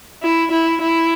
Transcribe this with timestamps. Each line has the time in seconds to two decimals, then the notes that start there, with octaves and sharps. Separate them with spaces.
0.23 E4
0.51 E4
0.81 E4